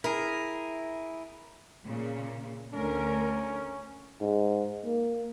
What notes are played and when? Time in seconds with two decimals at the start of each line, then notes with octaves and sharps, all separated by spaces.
0.04 E4 G#4 A#4
1.84 A#2 C#3 A#3
2.74 D2 D3 C#4 A#4
4.21 G#2
4.85 A#3